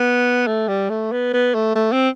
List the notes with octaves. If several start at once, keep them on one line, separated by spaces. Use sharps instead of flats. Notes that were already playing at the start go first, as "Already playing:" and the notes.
Already playing: B3
A3
G3
A3
B3
B3
A3
A3
C4